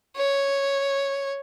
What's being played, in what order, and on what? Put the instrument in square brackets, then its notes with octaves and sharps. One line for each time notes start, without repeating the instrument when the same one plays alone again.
[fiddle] C#5